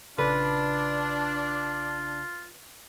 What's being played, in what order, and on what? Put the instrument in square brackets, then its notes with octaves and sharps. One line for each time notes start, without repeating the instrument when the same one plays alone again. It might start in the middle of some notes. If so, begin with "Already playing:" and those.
[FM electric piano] A#1 C#3 [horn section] D4 [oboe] F4 [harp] B4